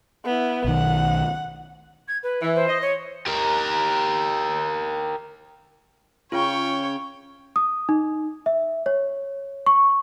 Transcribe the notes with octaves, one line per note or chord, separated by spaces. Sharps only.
B3 E4
B1 D#3 F#5
G#6
B4
E3
C5
D#5
C#5
G4 A#4
C#3 C#4 F4 C#5 G5
D#6
D#4
E5
C#5
C#6